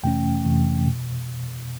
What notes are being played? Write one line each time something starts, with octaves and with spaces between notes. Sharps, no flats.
F2 C3 E3 A3 C#4 G5
F2 C3 E3 A3 C#4
B2